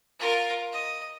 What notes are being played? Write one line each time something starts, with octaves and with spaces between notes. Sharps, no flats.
F4 A#4
D#5